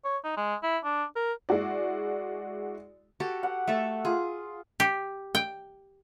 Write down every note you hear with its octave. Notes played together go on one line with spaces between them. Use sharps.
C#5
D#4
G#3
E4
D4
A#4
G#3 E4 F#4 D5
F#4 G4 A4
F#5
A3 A4 E5
F4 G#4
G4
G5